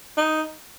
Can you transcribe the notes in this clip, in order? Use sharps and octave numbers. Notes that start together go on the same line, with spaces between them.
D#4